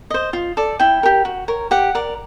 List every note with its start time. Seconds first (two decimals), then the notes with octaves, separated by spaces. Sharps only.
0.10 C5 D#5
0.33 F4
0.57 A4 D5
0.79 E4 G5
1.03 G4 A#4
1.25 F#4
1.48 A#4 C#5
1.71 G4 F#5
1.95 A#4 D5